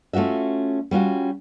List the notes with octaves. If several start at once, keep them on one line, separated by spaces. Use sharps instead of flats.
A3 C#4 F4 F#4 E5
G3 C#4 F4 F#4